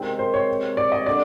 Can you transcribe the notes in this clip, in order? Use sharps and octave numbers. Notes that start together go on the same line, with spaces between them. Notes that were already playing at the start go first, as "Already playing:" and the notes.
Already playing: C3 D#3 G#3 C4
C5
C#5
D5
D#5
D3 D5